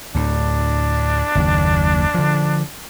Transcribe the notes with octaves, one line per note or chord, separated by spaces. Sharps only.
D2 A2 D4
F#1 D#2
D3 F3